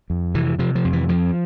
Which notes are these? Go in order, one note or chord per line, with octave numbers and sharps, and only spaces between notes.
F2
C3 E3
C3 F3
F3
F2
E3
F2 F3